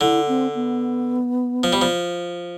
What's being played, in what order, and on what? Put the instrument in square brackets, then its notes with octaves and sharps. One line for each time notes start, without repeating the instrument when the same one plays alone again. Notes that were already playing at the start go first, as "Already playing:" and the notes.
[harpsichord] D3 [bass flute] E4
[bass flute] C4
B3
[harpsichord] F3
G3
F3